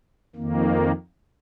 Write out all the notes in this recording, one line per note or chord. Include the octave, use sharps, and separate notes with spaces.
F2 D#3 A#3